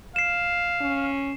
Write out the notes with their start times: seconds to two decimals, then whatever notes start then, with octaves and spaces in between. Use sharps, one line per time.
0.16 F5 C7 E7
0.81 C#4